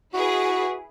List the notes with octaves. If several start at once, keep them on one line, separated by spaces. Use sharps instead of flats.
E4 F#4 G#4 B4